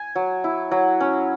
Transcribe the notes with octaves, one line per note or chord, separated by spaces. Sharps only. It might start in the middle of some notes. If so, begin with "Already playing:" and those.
Already playing: G#5
F#3
E4
F#3
C#4